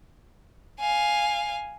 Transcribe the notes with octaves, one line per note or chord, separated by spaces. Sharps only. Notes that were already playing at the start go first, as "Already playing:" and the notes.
F5 G#5